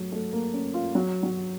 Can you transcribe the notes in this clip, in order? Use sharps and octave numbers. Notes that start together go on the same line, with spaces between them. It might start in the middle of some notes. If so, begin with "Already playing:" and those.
Already playing: F#3 A3
A3
A#3
C#4
F4
F#3
F#3